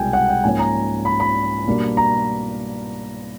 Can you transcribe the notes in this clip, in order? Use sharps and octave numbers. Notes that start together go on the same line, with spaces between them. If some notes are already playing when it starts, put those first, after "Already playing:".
Already playing: C2 B2 G#3 G5 G#5
F#5
G5
G#2 F3 A#3 C#4 G#5
A#5
B5
B5
B2 G3 A#3 D4
A#5